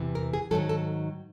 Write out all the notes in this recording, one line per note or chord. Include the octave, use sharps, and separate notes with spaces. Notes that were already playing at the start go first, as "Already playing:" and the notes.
Already playing: E2 C3 E3
A#4
G#4
G#2 D#3 F#3 A4
A4